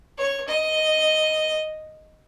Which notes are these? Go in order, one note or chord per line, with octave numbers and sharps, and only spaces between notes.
C#5
D#5